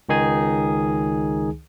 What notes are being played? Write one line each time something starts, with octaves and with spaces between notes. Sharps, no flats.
C#2 D#3 D#4 G#4 G#5